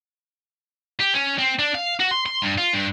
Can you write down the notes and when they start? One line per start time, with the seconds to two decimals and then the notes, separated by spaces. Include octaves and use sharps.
1.00 G4
1.14 C#4
1.39 C4
1.59 D4
1.75 F5
2.00 F#4
2.11 C6
2.26 C6
2.42 G2
2.58 F4
2.73 G2